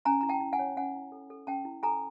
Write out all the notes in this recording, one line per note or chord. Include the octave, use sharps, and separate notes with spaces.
C#4 G#5 A#5
E4 A#5
G5 A5
E4
F#5 G#5
C#5
C#4 F#5 G#5
E4
A4
A4
C#4 G5 A5
E4
A4 G#5 A#5